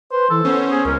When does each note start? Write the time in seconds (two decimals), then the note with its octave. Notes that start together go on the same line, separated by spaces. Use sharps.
0.12 B4 C5
0.30 E3 A4
0.45 B3 C#4 C5
0.71 G#4
0.85 C#2 G#3 C#4 A#4